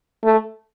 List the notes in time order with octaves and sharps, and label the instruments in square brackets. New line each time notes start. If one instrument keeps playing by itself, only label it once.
[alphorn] A3